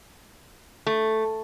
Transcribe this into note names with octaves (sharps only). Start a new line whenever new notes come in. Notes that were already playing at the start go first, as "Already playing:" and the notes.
A3